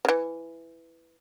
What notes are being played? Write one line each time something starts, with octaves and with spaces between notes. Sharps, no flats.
C#3 E3